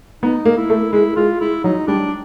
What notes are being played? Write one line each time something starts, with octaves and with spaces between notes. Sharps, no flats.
B3 D#4
A#3
E4
A3
G#3 E4
G#3 F4
G#3 E4
F#3 D#4
G3 D4